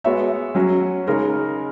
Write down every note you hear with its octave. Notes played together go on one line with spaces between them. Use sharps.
G#3 B3 F#4 C#5 E5
F#3 C#4 F#4
C#3 G#3 D#4 A#4 C#5